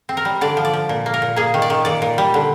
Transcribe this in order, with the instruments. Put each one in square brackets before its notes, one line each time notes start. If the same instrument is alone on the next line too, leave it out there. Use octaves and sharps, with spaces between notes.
[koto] C4
A#4
G3
D3 D5
F3
D5
F3
A#2
A#3
A#4
A#2
A#3 G#4
D#3
D5
D#3
A#2 D5
A#2
G3
D3